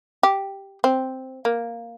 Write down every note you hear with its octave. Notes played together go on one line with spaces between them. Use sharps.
G4
C4
A#3